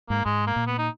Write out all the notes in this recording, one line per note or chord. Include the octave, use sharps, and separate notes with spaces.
G#2 A#3
G#2 G#3
A#3
A#2
B3
D#4